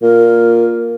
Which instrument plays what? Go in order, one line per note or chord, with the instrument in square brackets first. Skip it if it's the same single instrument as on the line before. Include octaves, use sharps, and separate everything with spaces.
[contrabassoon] A#2 [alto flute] A#4